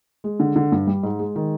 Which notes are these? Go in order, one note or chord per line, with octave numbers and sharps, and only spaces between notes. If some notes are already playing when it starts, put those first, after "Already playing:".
G#3
D3
D3
G2
G3
G#2
G#3
D#3